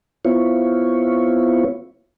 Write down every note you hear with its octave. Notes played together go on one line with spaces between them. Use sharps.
B3 C4 E4 F4 C#5